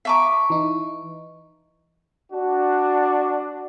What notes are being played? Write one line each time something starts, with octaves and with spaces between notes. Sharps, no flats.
E5 F5 A5 A#5 C#6 D6
E3 D#4
D4 F#4